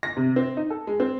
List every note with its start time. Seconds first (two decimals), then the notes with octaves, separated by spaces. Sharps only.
0.03 A#6
0.17 C3
0.36 C4
0.57 D#4
0.70 A4
0.87 G#3
1.00 C4